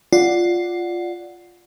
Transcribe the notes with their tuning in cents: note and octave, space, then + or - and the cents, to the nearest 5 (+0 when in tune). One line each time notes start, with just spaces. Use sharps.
F4 +0 D5 +0 F#5 +0